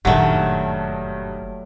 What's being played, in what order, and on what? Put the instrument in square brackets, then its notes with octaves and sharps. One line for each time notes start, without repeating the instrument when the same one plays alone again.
[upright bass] F#1 A#2 [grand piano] G2 D#3 [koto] F#3 A3